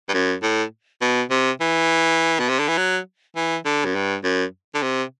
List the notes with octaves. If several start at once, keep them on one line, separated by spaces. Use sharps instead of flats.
G2
F#2
A2
B2
C3
E3
B2
C3
D3
E3
F#3
E3
D3
F#2
G2
F#2
D3
C3